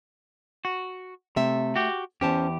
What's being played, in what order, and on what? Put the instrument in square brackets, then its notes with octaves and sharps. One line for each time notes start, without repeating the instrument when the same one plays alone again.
[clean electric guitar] F#4
[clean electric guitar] C3 [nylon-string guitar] A3 E5
[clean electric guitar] F#4 G4
[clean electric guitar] E2 G4 [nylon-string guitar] C#4 C5 A5